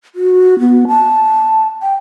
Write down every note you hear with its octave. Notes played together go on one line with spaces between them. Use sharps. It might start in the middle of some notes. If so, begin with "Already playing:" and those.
F#4
B3
A5
G5